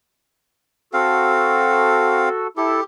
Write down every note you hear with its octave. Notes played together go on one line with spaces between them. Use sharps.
C4 F#4 A4 F5
E4 G4 A4